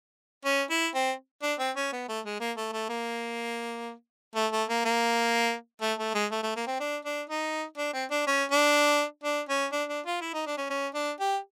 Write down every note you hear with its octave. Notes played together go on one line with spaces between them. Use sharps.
C#4
E4
C4
D4
C4
C#4
B3
A3
G#3
A#3
A3
A3
A#3
A3
A3
A#3
A#3
A3
A3
G#3
A3
A3
A#3
C4
D4
D4
D#4
D4
C4
D4
C#4
D4
D4
C#4
D4
D4
F4
E4
D#4
D4
C#4
C#4
D4
G4